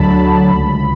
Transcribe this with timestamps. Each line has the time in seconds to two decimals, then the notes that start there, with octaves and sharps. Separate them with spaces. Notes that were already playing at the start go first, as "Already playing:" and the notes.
Already playing: D2 D3 F#3 A5 B5
0.17 D2
0.51 C#2